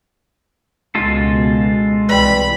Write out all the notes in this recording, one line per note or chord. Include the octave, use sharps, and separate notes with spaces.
C#2 B2 G#3 F4 A4
C2 E3 B4 D5 G5 B5